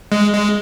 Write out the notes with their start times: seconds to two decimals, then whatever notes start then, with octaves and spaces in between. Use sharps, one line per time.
0.12 G#3
0.33 G#3